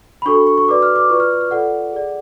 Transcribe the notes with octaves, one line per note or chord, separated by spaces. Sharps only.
B5
D4 F#4 A4 C#6
C#6
C#6
F#4 B4 D5 D6
F6
D6
F4 B4 D5 C#6
F6
F6
F6
F4 A4 D5 F#5
G#4 D5